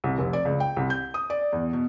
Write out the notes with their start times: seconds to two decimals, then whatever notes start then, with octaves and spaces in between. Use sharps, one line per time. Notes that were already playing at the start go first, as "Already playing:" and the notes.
0.04 C2
0.18 F1
0.33 D5
0.45 C#2
0.60 G5
0.77 C2
0.90 G6
1.14 D#6
1.30 D5
1.53 E2
1.73 B2